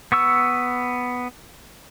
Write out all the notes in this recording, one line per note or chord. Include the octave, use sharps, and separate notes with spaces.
B3 C#6 E6